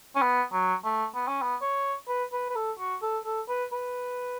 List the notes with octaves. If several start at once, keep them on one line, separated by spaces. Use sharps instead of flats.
C#4
B3
F#3
A3
B3
C#4
B3
C#5
B4
B4
B4
A4
F#4
A4
A4
B4
B4